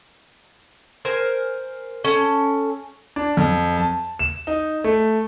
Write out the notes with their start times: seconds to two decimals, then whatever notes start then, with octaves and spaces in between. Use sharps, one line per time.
1.05 A#4 C5 G#5
2.04 C#4 A4
3.16 D4
3.37 F2
3.77 A5
4.19 E7
4.47 D#4
4.84 A3